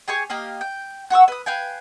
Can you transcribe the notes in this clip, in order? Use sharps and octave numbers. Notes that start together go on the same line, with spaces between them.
G4 G#4 G#5 C#6
A#3 G4 D#5 F5
G5
F#4 F#5 C#6 E6
B4 D#6
B4 F5 G5 G#5